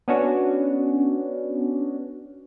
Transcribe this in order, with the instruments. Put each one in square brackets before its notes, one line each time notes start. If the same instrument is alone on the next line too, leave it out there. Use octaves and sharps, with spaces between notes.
[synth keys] B3 C#4 D4 F#4